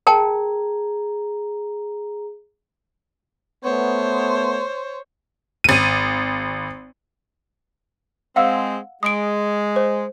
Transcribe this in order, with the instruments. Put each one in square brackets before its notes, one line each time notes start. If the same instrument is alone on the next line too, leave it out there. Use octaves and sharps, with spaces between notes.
[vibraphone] G#4 A#5 [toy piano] A#4 G5 A5
[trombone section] A3 B3 [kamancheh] C5 C#5
[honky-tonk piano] G#1 D#7
[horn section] G#3 C4 [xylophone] F5 F#5 E6
[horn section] G#3 [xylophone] D#6 D7
[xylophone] C5